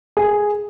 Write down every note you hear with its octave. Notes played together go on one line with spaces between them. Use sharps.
G#4